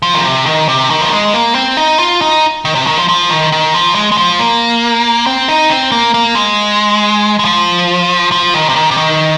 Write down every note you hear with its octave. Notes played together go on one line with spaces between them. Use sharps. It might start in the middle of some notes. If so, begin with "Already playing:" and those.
F3
D#3
C3
D#3
C3
D#3
F3
G#3
A#3
C4
D#4
F4
D#4
D#3
C3
D#3
F3
F3
D#3
D#3
F3
G#3
G#3
F3
A#3
C4
D#4
C4
A#3
A#3
G#3
G#3
F3
F3
D#3
C3
D#3
C3
D#3